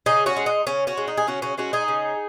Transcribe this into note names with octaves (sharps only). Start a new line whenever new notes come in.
C#3 D#4 G#4
C#4 F#4
G#3
D#4
C#3 C#4
C#4 F#4
G#3
D#4
G#4
C#3 C#4 F#4
C#4 F#4
G#3 C#4 F#4
D#4 G#4
C#3